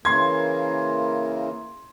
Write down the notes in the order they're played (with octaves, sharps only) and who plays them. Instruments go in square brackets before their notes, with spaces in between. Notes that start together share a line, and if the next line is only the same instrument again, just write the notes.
[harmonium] C#3 E3 A#3 [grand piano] C6 G#6